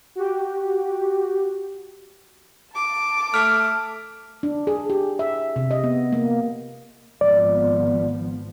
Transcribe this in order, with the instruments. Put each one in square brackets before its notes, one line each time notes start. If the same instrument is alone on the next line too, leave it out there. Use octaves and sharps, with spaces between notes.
[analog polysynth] F#4 G4
[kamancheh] A5 D6
[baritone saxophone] A3 [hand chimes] F6
[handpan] D4
G#4
G4
E5
C3
D#5
B3
A#3
[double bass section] G#1 F3 B3 [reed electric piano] D5